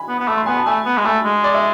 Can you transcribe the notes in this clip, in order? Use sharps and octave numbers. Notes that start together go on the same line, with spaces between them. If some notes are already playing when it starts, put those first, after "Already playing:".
Already playing: G#5 B5
B3
B3
A3 B5
C6
B3 G#5 B5
A5
A3 G#5 B5
B3
G#3
A3 G#5 B5
G#3
D5
E5